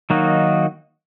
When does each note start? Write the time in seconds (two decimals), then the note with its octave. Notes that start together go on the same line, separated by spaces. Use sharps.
0.10 D#3 F#3 A#3 D#4 F#4